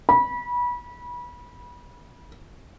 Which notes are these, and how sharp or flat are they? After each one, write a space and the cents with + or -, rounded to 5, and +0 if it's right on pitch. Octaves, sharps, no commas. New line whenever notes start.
B5 -25